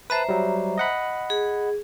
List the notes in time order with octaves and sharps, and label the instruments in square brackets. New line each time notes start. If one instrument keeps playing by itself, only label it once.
[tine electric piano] B4 A5 [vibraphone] C5 E5 A#5
[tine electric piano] F#3 G3
D#5 F#5 B5
[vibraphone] G#4